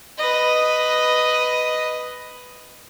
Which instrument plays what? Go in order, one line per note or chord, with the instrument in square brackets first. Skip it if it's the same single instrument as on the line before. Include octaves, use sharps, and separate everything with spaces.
[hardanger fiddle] B4 D#5